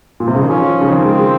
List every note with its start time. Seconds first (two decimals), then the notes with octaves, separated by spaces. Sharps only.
0.20 A#2
0.28 C3
0.35 C#3
0.42 D#3
0.50 F3 C#4
0.60 F3
0.71 D#3
0.81 C#3
0.92 D#3 C4
1.05 G#3
1.19 G#3